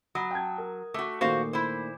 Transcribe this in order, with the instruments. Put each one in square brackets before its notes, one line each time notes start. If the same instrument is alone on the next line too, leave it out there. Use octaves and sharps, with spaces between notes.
[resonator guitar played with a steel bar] F#3 [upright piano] B5 D#6
[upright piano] G5 A5 G#6
A#4
[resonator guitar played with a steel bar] A3 F#4 [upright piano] D6
[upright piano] A#2 D#3 A3 [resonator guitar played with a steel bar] F#4 C5 F5
[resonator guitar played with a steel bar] E4 C5